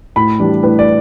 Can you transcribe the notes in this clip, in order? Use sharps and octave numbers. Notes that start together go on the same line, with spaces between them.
A2 B5
E3 G3 D4
A2 B4
D5